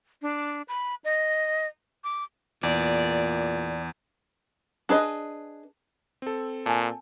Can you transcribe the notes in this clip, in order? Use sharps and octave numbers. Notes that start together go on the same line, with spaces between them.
D4
B5
D#5
D6
E2 A#2 D5
D4 G#4 B4 D#5
C4 A4
A#2 G#5 A5